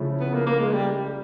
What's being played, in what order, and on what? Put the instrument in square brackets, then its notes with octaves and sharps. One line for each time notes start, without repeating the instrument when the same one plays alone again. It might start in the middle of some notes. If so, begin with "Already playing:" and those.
Already playing: [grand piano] C#3 F3 A3 C#4 E4
[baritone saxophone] B3
A#3
A#3
G#3
G3